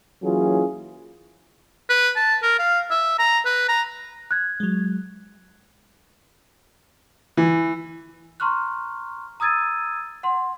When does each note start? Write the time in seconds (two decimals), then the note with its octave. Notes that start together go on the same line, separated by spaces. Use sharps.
0.23 E3 F#3 A#3 C#4 F4 G#4
1.89 B4
2.16 A5
2.42 A#4
2.59 F5
2.91 E5
3.19 A#5
3.45 B4
3.68 A#5
4.31 F#6 G#6
4.60 F#3 G#3
7.37 E3
8.40 A#5 C6 C#6 F6 F#6
9.40 A#5 D#6 E6 G#6 A6 D#7
10.23 F#5 C6